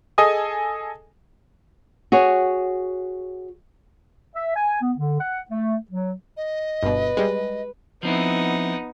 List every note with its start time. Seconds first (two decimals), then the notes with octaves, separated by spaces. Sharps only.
0.18 G#4 A4 D#5 G#5 D#6
2.12 F#4 G#4 C#5
4.35 E5
4.56 G#5
4.82 B3
4.98 D3
5.20 F#5
5.50 A3
5.91 F#3
6.37 D#5
6.83 G1 B2 B4
7.17 G3 G#3
8.03 F3 B3 C4 D#4 E4